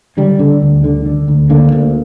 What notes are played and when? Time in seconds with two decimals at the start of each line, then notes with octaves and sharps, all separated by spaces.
0.17 D3 G3
0.39 D3
0.62 D2
0.84 D3
1.05 D3
1.28 D2
1.50 D3 A#3
1.72 D2